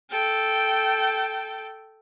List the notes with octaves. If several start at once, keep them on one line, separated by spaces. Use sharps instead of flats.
A4 G5